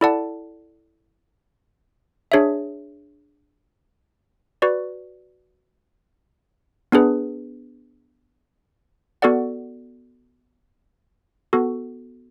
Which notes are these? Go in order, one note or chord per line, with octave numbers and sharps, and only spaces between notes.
E4 A4 D5 F#5 A5
D4 G#4 C#5 E5
F#4 B4 D5
B3 D4 G#4 B4
B3 F#4 A4 D5 F#5
B3 F#4 A4